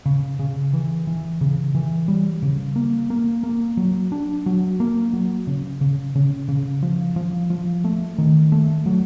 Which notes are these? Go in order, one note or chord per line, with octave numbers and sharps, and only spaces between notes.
C#3
C#3
E3
E3
C#3
E3
G3
C#3
A#3
A#3
A#3
F#3
D4
F#3
A#3
F#3
C#3
C#3
C#3
C#3
F3
F3
F3
A3
D#3
A3
F#3